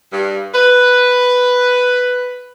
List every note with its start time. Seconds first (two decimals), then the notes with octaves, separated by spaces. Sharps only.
0.12 G2
0.54 B4